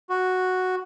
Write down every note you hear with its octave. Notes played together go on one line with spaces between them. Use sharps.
F#4